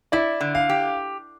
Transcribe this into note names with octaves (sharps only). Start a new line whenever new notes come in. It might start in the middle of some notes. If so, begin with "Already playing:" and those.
E4 D5
D3
F5
G4